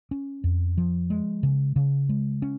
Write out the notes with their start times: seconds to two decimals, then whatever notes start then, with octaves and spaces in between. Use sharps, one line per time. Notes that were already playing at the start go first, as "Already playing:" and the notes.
0.11 C#4
0.44 F2
0.77 F3
1.10 G#3
1.43 C#3
1.76 C#3
2.09 G#3
2.42 C#4